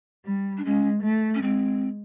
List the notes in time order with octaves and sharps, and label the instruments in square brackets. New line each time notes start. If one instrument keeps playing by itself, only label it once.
[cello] G3
[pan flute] D4
[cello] G#3 [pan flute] C#4
[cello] A3
[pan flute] C#4
[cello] G#3 [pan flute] C4